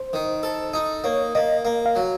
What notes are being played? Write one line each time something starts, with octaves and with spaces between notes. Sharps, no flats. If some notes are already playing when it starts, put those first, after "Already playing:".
Already playing: C5
D#3
A4
D#4
A#3 C#5
A#3 D#5
A#3 F5
F5
F#3